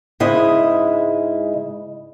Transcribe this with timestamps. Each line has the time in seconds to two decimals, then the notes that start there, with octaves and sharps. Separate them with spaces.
0.20 G#2 C#3 G#3 E4 D#5